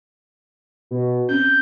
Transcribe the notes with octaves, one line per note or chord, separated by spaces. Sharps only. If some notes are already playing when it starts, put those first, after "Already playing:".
B2
C4 C#4 G6